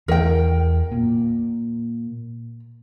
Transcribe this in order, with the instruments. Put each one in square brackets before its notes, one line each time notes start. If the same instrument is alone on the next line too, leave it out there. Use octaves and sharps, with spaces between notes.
[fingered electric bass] E2 E3 [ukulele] A#4 G5
[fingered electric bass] A#2